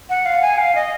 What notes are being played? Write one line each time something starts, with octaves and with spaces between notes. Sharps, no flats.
F#5
F5
G#5
F5
D#5